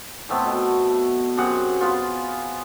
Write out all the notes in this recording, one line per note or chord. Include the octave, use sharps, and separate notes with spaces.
A2 A3 B3 C4
B2
F#2 C3 G#4 F#5
B3 F4